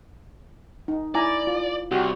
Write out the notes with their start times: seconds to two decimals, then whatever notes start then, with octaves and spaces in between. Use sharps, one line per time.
0.88 D#4
1.15 E4 D5 G#5 A#5
1.47 F4
1.91 C2 F#4 G4